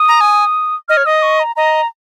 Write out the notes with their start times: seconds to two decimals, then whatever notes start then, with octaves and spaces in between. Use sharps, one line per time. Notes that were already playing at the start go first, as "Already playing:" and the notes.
Already playing: D#6
0.09 A#5
0.21 G#5
0.88 D#5 F6
0.97 C#5
1.06 D#5 D#6
1.22 C#6
1.40 A#5
1.56 D#5 A#5